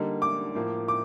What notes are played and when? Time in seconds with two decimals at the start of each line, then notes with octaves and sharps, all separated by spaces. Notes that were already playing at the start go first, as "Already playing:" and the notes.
Already playing: D3 G3 A#3 D#4
0.22 D6
0.55 A2 F3 A#3
0.88 D6